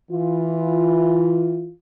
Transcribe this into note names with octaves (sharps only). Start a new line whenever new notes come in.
E3 F4